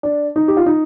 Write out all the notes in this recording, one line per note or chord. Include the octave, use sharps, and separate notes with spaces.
D4
D#4
G4
F4
D#4